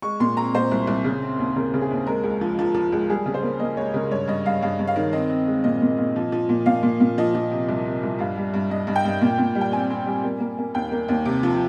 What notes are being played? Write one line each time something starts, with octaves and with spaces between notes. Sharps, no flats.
G#3 C#6
A#2 C6
C4 A#5
A#2 C5
C2
C2
C#3
C4
D#2
C#3 A#4
C#3
G#4
D#2
G#3 A#4
C#2
F3
F3
F3
C#2
G3 G#4
C#3
C5
A#3
A#3 D#5
C#2 C#5
C#3 A#4
G2 C#5
G2 D#5
G2 F5
G2 F5
G2
F5
D#3
C4 D#5
C4
G#3
A#2 D#5
A#2
A#2
F3
F3
A#2
A#2 F5
A#2
A#2
F3 D#5
F3
C3
C2
C3
C2
G2 F5
G3
G2
G2 D#5
G2
G5
G2
A#2
A#2
G3
G5
C4 G#5
C4
G3
A#3
A#3
A#3
D#2 G5
A#3
D#2
C3
F3